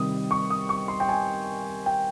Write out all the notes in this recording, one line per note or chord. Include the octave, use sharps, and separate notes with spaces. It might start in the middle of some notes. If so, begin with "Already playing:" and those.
Already playing: C3 D#3 G3 D#6
C#6
D#6
C#6
C6
G5
G#5
G5